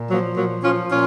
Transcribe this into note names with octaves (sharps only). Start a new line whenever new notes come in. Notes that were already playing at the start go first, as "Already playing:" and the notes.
Already playing: A#2
F3 F#3 A#3
A#2 F#3 A#3
F3 C#4 F4
A#2 C#4 F4